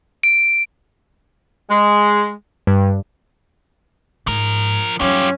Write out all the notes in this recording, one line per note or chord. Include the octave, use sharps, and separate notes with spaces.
D7
G#3
G2
G#2 F3 A#4
G2 F#3 C#4 F4 G4